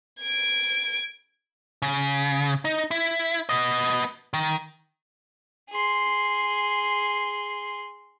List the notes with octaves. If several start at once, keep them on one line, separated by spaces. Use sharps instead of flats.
G#6 D7
C#3
D#4
E4
B3 D#5
D#3
G#4 C6